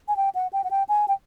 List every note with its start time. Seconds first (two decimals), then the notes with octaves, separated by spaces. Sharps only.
0.08 G#5
0.17 G5
0.35 F#5
0.53 G5
0.64 F#5
0.71 G5
0.89 G#5
1.08 G5